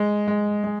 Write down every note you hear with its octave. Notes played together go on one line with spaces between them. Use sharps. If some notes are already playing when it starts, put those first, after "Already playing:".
Already playing: G#3
G#3
G#3